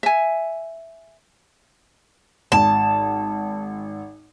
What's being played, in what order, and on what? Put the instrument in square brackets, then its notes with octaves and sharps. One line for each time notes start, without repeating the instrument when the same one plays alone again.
[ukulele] E5 G#5
[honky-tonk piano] G#1 [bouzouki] A5